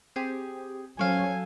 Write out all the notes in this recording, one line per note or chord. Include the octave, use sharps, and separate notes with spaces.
C4 G4 G#4
F#3 C#4 A4 C5 C#5 F5 G#5